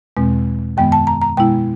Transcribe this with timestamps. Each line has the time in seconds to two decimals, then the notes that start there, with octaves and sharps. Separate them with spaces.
0.17 E2 B2 G#3 C4
0.77 F#2 D#3 G#3 B3 G5
0.92 A5
1.07 A#5
1.22 A#5
1.37 B2 G#3 B3 E4 G5